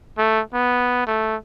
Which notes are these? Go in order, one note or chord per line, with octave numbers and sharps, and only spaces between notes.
A3
B3
A3